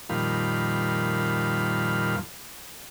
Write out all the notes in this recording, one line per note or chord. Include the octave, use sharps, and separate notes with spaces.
F2 A#2 D#3 G3 F5 B5